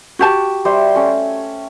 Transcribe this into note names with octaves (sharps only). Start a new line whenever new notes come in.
F#4 G4 A5
G3 C5 E5
A3 C#4